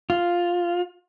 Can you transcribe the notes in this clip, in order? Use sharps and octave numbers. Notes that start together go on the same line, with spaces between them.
F4